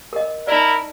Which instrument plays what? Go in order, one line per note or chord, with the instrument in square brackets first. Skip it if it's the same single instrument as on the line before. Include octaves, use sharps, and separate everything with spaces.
[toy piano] A#4 D#5
[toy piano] D#4 D5 [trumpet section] E4 A#4 B5